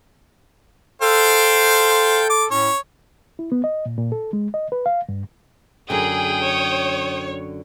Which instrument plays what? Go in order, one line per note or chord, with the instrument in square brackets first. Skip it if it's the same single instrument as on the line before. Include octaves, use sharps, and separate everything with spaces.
[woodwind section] A4 [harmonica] C5 F5 G5
[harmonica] D6
[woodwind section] A2 C#4 [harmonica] C#5
[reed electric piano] E4
B3
D#5
A#2
A#2
A4
G#3
D#5
B4
F5
G2
[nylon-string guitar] F#2 D3 [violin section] G#4 [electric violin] G5 D#6
[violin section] C#5